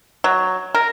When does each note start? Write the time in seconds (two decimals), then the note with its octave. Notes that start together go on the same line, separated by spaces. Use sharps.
0.24 F#3
0.75 A#4